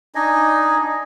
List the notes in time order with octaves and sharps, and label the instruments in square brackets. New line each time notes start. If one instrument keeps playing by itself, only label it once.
[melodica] D4 D#4 D#5 G#5